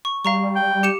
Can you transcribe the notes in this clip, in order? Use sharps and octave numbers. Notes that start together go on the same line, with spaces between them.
C#6
G3 F5 A#5 C#6
G5
G4 C#7 E7